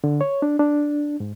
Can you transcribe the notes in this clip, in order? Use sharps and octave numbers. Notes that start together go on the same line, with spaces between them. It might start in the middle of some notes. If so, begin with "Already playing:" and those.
D3
C#5
D4
D4
G#2